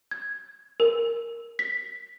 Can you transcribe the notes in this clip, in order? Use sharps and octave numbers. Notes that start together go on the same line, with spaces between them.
G#6
A#4
B6